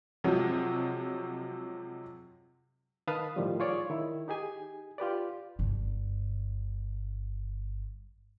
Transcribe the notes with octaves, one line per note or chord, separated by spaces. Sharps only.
C3 F3 F#3 G#3
D#3 B4 F5 A5 D#6
A2 D#3 F3 G3
F4 G#4 C#5 D5
D#3 E4
D#4 G4 G#4 G#5
F4 G4 B4 D5
G1 G2